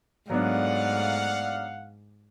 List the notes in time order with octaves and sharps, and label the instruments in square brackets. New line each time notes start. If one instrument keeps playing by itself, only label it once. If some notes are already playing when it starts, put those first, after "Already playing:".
[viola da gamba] G#2 [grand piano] F#3 B3 D4 [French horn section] A3 D5 [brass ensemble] F5 F#5